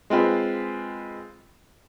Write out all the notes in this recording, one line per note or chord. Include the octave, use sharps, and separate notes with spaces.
G#3 C4 F4 B4